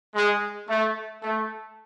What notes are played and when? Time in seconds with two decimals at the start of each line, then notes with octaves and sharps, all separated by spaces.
0.15 G#3
0.68 A3
1.23 A3